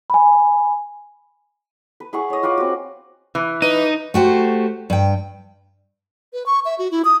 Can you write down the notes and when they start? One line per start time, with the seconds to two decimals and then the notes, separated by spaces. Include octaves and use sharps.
0.10 G#5 B5
2.00 B4
2.13 E4 G#4 F#5 C#6
2.30 C#5 D#5
2.43 F4 B4 F#5 D6
2.57 C4 F#4
3.35 E3
3.62 D#4 B4 D#7
4.14 A3 F#4 G4 C5
4.90 G2 G5
6.33 B4
6.46 C#6
6.65 E5
6.79 F#4
6.91 E4
7.05 D#6